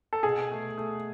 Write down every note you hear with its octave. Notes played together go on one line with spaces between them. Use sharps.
A4
B2 G#4
A3
A3